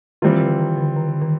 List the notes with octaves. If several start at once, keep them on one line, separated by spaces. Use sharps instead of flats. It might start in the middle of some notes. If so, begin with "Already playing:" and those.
D#3 E3 G3 C4 F4
D3
D#3
D3
D#3
D3
D#3